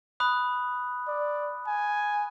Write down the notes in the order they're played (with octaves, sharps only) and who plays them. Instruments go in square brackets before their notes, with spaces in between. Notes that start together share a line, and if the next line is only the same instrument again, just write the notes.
[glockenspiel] B5 D#6 F#6
[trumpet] D5
G#5